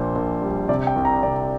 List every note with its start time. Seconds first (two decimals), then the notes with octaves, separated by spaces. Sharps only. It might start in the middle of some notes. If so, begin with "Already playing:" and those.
Already playing: A#1 A#2 C5
0.15 A#1
0.42 G3
0.69 C3 D5
0.87 G5
0.96 C2
1.05 A#5
1.23 C2 D5